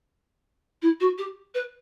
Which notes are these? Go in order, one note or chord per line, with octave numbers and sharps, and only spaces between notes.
E4
F#4
G4
B4